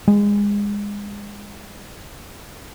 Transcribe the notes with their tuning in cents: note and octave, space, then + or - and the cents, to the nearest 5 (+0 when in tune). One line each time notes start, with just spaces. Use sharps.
G#3 -25